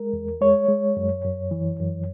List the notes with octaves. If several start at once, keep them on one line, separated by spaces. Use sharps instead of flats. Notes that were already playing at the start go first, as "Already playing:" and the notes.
Already playing: G#3 A#4
E2
G#3 C#5
G#3
F#2
F#2
E3
F#2